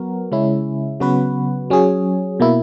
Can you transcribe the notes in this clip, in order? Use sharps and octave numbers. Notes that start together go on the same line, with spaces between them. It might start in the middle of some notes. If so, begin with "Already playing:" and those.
Already playing: F#3 B3 F#4 A#4
C#3 G#3 C#4 E4
C#3 F#3 B3 F#4 B4
F#3 C#4 G#4
B2 A#3 E4